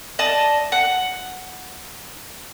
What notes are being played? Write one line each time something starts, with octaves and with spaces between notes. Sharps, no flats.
D5 D#5 A5
F#5